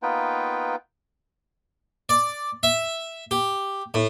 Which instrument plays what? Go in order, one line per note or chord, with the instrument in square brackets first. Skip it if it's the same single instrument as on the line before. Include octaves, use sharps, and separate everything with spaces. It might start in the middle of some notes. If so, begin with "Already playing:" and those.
[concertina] A#3 B3 D#4 F4 B4 G5
[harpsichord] D5
E5
G4
A2